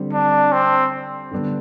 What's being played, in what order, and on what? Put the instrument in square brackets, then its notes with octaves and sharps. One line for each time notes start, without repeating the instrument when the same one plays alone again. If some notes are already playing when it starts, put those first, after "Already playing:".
Already playing: [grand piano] D3 G3 C4
[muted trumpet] D4
C4
[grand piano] D3 G3 B3 D4